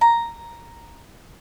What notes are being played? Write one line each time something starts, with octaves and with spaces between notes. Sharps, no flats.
A#5